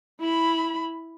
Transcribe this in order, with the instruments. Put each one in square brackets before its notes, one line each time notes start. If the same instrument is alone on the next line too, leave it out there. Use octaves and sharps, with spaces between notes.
[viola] E4 B5